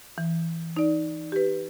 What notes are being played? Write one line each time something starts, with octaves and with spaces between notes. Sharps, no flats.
E3
D#4 D5
G4 B4